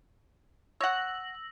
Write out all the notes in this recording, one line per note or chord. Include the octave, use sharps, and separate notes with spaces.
C#5 F#5 E6 A#6 F#7